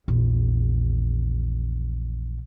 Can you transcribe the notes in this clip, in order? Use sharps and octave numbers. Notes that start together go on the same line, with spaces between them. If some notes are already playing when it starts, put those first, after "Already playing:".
A#1 E2